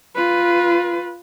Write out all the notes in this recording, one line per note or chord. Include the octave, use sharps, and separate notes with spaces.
F4 B4